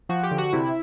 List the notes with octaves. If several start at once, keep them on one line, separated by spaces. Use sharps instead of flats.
F3 F#4
G4
D3
F#4
C3 E4